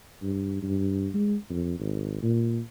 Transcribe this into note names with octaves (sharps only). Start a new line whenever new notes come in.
G2
G2
G#3
F2
G#1
A#2